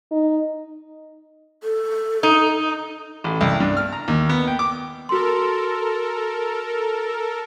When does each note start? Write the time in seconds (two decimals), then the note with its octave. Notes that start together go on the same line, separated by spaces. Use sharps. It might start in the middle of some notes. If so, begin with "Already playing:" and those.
0.11 D#4
1.63 A4
2.23 D#4
3.24 A1
3.41 C2
3.60 G2
3.77 F6
3.92 A#5
4.08 D#2
4.29 B3
4.47 G5
4.59 D6
5.09 F#4 A4 A#4 C6